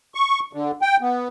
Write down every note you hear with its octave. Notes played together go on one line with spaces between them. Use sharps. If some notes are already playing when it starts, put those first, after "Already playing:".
C#6
D3
G5
B3